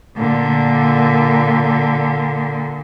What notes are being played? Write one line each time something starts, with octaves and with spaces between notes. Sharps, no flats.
A#2 D3